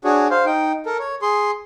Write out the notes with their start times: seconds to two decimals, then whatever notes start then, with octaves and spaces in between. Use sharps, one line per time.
0.04 D4 F#4 G#4 C#5
0.30 C5 F5
0.46 D#4 G5
0.86 A4 A#4
0.99 C#5
1.22 G#4 C6